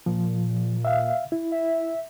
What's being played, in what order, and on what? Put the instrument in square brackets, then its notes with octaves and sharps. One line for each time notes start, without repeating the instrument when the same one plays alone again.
[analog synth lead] A#2 [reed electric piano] F3
[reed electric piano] E5 F5
E4
[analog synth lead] E5